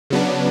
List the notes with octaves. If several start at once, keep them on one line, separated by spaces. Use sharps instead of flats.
C#3 F#3 B3 D4